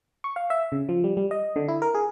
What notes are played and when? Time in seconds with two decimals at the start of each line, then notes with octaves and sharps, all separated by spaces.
0.24 C#6
0.36 F5
0.50 E5
0.72 C#3
0.89 F3
1.04 G3
1.17 G3
1.31 D#5
1.56 D3
1.68 E4
1.82 A#4
1.94 G#4